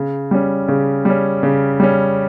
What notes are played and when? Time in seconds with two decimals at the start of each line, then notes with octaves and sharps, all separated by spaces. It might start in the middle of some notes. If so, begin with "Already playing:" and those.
Already playing: C#3
0.31 G3 C#4
0.68 C#3
1.05 G3 C#4
1.43 C#3
1.80 G3 C#4